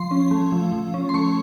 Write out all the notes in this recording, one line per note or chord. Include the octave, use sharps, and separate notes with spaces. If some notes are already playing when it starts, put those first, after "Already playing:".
Already playing: F3 C6
C#4
A3
F3
F3
C#4
C6
A3 C#6